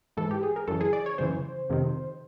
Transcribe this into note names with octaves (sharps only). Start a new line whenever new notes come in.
G#2 E3 A4
G4
G#4
A#4
F#2 C#3 E3 A4
G#4
D5
C#5
F#2 C#3 E3 C5
F2 C3 D#3